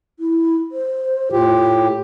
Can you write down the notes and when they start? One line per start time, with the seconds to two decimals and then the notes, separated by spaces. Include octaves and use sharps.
0.20 E4
0.72 C5
1.32 A2 F4 G4